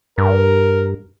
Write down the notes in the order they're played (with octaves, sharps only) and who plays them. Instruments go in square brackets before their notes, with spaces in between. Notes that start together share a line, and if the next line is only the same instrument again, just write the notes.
[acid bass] G2 [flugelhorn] A#4